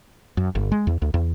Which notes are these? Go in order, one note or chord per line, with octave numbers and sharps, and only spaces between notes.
F#2
G1
G#3
E2
D2
E2